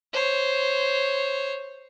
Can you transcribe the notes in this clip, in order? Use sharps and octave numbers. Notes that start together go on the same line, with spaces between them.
C5 C#5